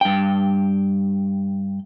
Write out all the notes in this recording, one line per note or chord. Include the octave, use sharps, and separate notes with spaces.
G2 G5